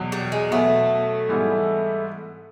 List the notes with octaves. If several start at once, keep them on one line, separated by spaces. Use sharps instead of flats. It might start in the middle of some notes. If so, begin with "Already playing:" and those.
Already playing: E2 B2 F#3
G3
G#3
B2 F#3 A3 B3
G#2 E3 G3 B3 E4